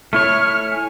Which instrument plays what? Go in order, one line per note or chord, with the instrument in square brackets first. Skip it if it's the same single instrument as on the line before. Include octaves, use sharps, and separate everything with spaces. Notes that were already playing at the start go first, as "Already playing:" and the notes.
[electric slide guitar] A3 E4 C#5 [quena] F6
[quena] G#5